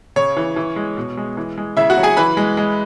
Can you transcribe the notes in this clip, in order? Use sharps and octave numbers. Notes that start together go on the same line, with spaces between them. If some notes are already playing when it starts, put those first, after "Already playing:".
C#3 C#5
E3
E3
G#3
B2
G#3
E3
G#3
C#3 E4 E5
F#4 F#5
F#3
G#4 G#5
E3 B4 B5
G#3
G#3